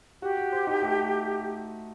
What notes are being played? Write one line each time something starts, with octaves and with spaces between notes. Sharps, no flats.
F#4 G4
F#4
C5
D#4
A3